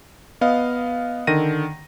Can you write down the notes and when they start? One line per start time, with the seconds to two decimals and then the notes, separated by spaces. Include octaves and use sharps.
0.41 B3 D#5 F5
1.27 D3 D#3 A#6 D#7